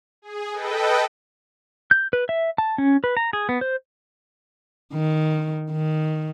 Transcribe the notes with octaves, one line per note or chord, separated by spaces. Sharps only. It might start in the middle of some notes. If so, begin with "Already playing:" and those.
G#4
A4 B4 D#5 G5
G6
B4
E5
A5
C#4
B4
A#5
G#4
B3
C5
D#3
D#3